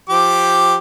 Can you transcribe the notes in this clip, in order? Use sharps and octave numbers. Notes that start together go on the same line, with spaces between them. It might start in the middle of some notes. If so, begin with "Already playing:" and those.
F3 G4 D6